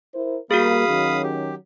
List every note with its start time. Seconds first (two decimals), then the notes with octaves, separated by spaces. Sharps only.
0.14 E4 A#4 C5
0.51 G3 A#3 F#4 G#4 F5 B5 D#6
0.87 D#3 F#3 C#4
1.23 G4